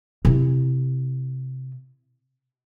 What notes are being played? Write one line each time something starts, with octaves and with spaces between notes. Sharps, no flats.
C3 E4